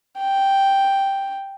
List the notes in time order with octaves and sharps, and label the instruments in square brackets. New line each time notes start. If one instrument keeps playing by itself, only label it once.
[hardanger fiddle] G5